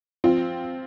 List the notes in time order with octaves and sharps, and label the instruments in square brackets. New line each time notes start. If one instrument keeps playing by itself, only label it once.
[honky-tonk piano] F3 C4 F4